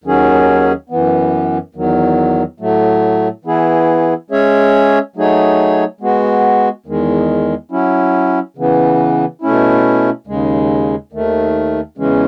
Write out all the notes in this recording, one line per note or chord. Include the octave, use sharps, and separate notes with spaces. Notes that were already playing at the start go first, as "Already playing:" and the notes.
D#2 D#3 F#3 C#4 G#4
F#2 E3 B3
E2 D#3 F#3
A2 F#3 A3
E3 B3 E4 G#4
G#3 C#4 G#4 C#5 E5
F#3 A3 D#4 G#4 C#5
G#3 B3 F#4
E2 D#3 G#3
F#3 C#4 E4
C#3 E3 B3
B2 A3 C#4 E4
D#2 C#3 G#3
D#2 D#3 A3
E2 C#3 E3 G#3 C#4